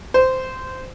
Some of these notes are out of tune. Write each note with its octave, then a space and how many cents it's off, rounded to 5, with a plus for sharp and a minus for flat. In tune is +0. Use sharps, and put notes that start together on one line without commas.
C5 -15